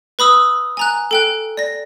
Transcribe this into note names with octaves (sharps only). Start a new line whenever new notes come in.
B4 B5 D#6 E6
G#5 A#5 F#6
A4 G5 F#6
D5 A#6